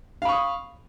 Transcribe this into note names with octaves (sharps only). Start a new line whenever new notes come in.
F5 B5 C#6 D#6